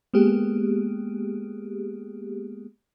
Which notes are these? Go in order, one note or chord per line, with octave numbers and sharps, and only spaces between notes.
G#3 A#3 B3 G4 G#4